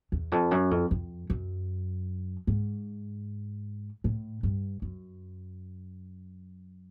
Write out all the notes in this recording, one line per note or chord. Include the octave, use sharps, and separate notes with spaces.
E2
F2
F#2
F2
F2
F#2
G#2
A2
G2
F#2